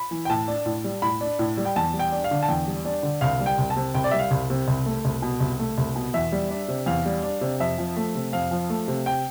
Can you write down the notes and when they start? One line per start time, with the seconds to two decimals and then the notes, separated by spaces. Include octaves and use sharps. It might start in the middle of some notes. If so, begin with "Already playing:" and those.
Already playing: B5
0.11 E3
0.25 G5
0.30 A2 A5
0.48 D4
0.66 A2
0.84 G3
1.02 A2 B5
1.21 D4
1.39 A2
1.57 G3
1.65 G5
1.76 E2 A5
1.93 G3
1.99 G5
2.12 D4
2.24 F5
2.31 D3
2.43 A5
2.49 E2 G5
2.67 G3
2.85 D4
3.03 D3
3.21 C2 F5
3.40 G3
3.46 G5
3.58 C2
3.70 A5
3.76 C3
3.95 C2 G5
4.04 D5
4.11 G3 E5
4.19 F5
4.31 C2
4.50 C3
4.68 C2
4.86 A3
5.05 C2
5.22 B2
5.40 C2
5.59 A3
5.78 C2
5.96 B2
6.14 E2 E5
6.32 G3
6.51 D4
6.68 C3
6.86 E2 F5
7.06 G3
7.23 D4
7.41 C3
7.60 F2 E5
7.78 F3
7.97 A3
8.15 C3
8.33 F2 F5
8.51 F3
8.70 A3
8.88 C3
9.06 G5